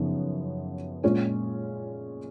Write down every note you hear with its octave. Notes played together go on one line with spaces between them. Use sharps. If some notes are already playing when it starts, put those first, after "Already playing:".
Already playing: F#2 C#3 F3 B3 D#4
A#2 G#3 C#4 F4